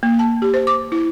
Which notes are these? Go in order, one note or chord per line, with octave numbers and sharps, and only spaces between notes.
A#3
A5
G4
C5
D6
E4